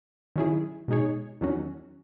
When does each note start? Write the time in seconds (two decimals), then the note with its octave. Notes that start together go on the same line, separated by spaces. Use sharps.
0.36 D#3 F#3 C#4 E4 G#4
0.88 B2 G#3 D#4 G#4 C#5
1.41 E2 D#3 F#3 C#4 F#4